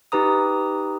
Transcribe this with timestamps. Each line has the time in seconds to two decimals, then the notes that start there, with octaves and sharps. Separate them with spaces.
0.12 D#4 G4 B4 A#5 D#6